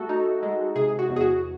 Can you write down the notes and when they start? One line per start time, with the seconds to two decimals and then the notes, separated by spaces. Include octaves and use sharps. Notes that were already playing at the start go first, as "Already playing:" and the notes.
Already playing: A3 F#4 A4
0.09 D#4
0.43 G#3
0.76 C3 G#4
0.99 F#4
1.09 E2
1.16 G#4
1.21 F#4